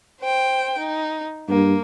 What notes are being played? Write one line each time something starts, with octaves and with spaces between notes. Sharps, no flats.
C5 G5
D#4
G2 A#3